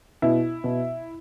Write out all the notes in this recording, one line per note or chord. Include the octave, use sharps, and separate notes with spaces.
B2 E4
B2